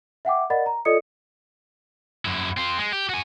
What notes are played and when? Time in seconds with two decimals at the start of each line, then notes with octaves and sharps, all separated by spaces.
0.25 E5 F#5 G5 D6
0.50 A#4 D5 D#5 F#5 B5 A6
0.66 A#5
0.85 F4 A4 D5 D#5 D#6 C#7
2.25 F#2 E4
2.57 C4 F4
2.78 G#3
2.93 G4
3.09 F#4 G#5